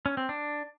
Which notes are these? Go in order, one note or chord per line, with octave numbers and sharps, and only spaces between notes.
C#4
C4
D4